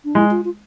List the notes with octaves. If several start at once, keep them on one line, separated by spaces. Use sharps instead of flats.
D4
G#3 E4
F4
F4